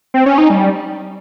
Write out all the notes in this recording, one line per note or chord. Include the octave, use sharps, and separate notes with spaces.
C4
C#4
D#4
G3